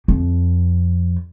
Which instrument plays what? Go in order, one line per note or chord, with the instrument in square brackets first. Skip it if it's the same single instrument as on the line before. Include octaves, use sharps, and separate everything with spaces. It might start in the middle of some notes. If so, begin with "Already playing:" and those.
[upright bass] F2